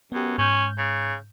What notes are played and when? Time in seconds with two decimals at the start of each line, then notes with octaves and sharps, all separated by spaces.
0.12 F#2 B3 G4
0.38 G#2 C#4 G6
0.78 C#3